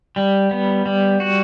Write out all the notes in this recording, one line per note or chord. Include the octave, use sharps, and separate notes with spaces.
G3
B3
G3
F#4